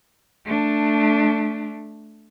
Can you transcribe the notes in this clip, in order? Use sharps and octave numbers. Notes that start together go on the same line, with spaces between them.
A3 D4